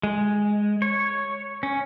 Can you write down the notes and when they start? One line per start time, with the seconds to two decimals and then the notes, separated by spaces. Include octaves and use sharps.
0.03 G#3
0.82 C#5
1.63 C#4